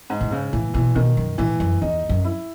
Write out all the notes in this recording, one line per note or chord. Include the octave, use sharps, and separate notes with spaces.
G#2
A2
G#2 C#3
A2 E3
B2 E3
B2 D#3
F#2
A2 E3
F#2
E2 D#4
F#2
E4